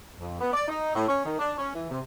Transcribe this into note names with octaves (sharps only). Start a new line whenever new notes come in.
F2
B3
D5
D#4
A2
C#4
D#3
D4
C#4
E3
C3